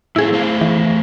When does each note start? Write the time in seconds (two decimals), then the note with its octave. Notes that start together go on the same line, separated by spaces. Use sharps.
0.16 A2 A3 C4 E4 G#4
0.32 A3 C5 F5
0.61 E3